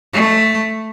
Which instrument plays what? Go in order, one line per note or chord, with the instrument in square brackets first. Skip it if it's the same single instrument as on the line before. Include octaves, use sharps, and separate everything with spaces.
[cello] A3